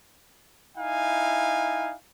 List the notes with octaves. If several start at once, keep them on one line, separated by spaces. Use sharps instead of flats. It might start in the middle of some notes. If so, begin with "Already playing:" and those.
D#4 E4 F5 G#5